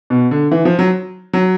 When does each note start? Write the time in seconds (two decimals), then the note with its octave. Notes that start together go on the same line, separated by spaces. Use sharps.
0.10 B2
0.31 D3
0.51 E3
0.65 F3
0.79 F#3
1.33 F#3